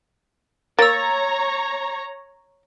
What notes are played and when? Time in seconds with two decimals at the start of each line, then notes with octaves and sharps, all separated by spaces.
0.79 A#3 C#5 A#5 E6 A6